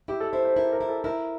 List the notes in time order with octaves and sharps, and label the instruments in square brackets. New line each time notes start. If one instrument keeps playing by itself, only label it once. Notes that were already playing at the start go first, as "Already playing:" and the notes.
[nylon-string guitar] E4 [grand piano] G4
[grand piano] A4
[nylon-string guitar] E4 [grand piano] C5
[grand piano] C5
[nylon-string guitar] E4 [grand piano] A#4
[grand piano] A#4
[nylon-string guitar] E4
[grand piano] A4
[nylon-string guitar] E4 [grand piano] A#4